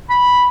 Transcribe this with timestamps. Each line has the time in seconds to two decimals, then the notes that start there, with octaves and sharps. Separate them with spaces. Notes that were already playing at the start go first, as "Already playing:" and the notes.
0.09 B5